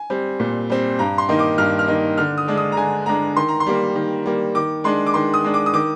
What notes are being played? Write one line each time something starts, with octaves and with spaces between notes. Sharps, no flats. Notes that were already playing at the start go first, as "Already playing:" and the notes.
Already playing: G#5
G3 C4
A#2
G3 C4
G2 A#5
C6
D#3 A#3 D#4
D6
G2 F6
F6
D#3 A#3 D#4
D3 F6
D#6
G#3 D4
D#6
A#5
D3 G#5
G#3 D4 A#5
D#3 C6
A#5
C6
G3 A#3
D#3
G3 A#3
D#3 D6
G#3 D4 C6
D6
D#3 C6
D#6
G#3 D4
D6
D#6
D#3 D6